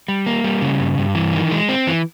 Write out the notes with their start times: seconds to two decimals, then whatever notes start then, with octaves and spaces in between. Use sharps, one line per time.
0.08 G3
0.26 A#3
0.44 G3
0.62 C#3
0.80 G2
0.98 G2
1.15 E3
1.33 D#3
1.51 G#3
1.69 C4
1.87 E3